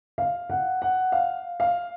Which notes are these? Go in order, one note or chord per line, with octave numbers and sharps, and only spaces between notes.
F5
F#5
F#5
F5
F5